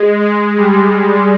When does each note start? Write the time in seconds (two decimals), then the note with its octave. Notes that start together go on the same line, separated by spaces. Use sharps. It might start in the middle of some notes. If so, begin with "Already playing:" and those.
Already playing: G#3
0.20 G#3
0.57 G3